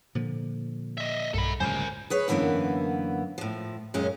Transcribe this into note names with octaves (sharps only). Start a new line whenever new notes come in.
A#2 D3 F3
D#5 E5
B1 G2 A4 B5
D1 C#2 F#3 A#4 C5 G#5
G#4 B4 C#5
F#2 D3 E3 A#3 B3
A2 F3
F#2 A#2 G#3 C#4